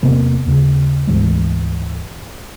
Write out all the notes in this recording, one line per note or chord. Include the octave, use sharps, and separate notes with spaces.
E2 C3 A#3 B3
D#2 C#3
D2 G#2 E3 G#3